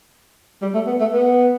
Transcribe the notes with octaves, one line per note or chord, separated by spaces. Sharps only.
G3
A3
B3
A3
B3